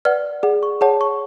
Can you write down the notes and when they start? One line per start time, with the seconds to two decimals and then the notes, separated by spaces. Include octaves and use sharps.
0.05 B4 D5 F#5 F6
0.43 G#4 D5 F#5
0.63 C#6
0.81 G#4 C#5 F#5 A5
1.01 C#6